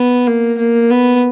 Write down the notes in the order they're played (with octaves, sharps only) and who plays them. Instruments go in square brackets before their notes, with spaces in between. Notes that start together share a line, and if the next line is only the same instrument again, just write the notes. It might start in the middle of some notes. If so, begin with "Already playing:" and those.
Already playing: [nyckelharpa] B3
A#3
A#3
B3